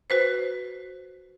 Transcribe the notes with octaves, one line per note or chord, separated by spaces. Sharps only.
F#4 B4 C5